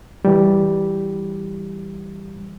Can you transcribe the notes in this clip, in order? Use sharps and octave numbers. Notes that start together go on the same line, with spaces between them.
E3 G3